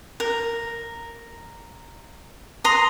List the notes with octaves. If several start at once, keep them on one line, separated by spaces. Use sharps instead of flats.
A#4
A#5 C6 D#6